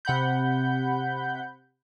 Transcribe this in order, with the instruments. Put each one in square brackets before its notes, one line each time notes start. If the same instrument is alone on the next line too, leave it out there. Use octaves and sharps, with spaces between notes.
[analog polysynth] C3 F#5 B5 G6